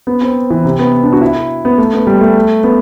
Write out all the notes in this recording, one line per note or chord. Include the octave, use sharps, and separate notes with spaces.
B3
C4
E3
C3
B3
D4
F#4
E4
B3
A3
B3
G3
A3
B3